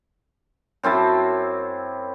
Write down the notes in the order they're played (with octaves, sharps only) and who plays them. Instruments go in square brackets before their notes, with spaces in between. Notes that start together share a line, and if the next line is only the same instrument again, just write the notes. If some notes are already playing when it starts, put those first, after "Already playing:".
[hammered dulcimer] F#2 C4 E4 A5